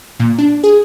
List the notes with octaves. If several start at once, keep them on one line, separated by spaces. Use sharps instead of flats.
A#2
D4
G#4